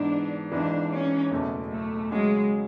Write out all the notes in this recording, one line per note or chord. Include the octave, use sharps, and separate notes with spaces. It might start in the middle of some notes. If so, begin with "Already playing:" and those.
Already playing: G#2 E3 B3 D4
G#1 G#2 E3 D4
C#4
F#1 E2 B2 A3
A3
C#3 F#3 G#3 C#4 G#4